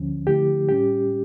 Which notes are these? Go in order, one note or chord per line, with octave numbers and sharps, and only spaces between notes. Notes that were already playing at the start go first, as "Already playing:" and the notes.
Already playing: D2 D3 F3 C#4
D3 F3 A3 E4 G4
A2 G3 C#4 G4